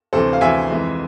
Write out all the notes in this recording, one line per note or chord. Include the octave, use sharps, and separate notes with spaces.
D2 C3 E3 A4 C5
F5
D2 C3 E3 E5 G#5
F2 E3 G#3